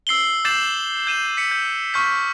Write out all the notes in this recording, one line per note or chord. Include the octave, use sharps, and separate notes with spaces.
E6 C7 F#7 G7
D6 G6 A6 C7 E7 F#7
G6 D#7 E7
B6 C#7
G6
C#6 F6 G6 B6